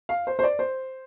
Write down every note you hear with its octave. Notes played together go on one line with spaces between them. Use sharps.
F5
C5
C5
D5
C5